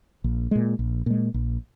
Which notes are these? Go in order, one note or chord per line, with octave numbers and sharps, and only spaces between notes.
A#1
A#2 G#3
A#1
A#2 G#3
A#1